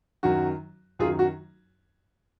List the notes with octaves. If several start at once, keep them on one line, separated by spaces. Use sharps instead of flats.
F#2 D#3 F#3 F#4
F#2 D#3 F#3 F4 G#4
F#4